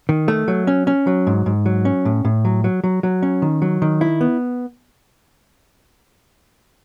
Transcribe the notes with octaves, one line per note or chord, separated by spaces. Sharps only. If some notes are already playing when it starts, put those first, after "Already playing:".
D#3
A3
F#3
C#4
C#4
F#3
G#2
G#2
F#3
C#4
A2
A2
F#3
F#3
F#3
F#3
C#4
D#3
F#3
D#3
E4
B3